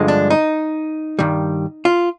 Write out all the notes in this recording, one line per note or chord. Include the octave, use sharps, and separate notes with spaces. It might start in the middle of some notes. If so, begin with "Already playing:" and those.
Already playing: G2 D3 F3 G#3
D4
D#4
G2 D#3 G3
F4